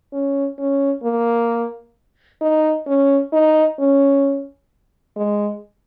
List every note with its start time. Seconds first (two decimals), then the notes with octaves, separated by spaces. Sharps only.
0.13 C#4
0.59 C#4
1.03 A#3
2.41 D#4
2.87 C#4
3.33 D#4
3.79 C#4
5.16 G#3